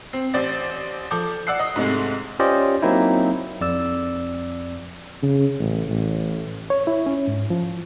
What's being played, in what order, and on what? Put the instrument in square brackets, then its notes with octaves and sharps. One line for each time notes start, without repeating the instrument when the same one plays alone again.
[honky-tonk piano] C4
A1 C5 D5 A6
F3 A4 D6 G6
D5 F#5 E6 F#6 C7
D#5 D#6
G#2 C3 G#3 A3
[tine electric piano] C#4 F4 G4 C5 D5 D#5
F#3 A#3 C4 D#4 E4
F2 D5 E6
[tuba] C#3
A1
A1
[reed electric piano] C#5
E4
C#4
G#2
F3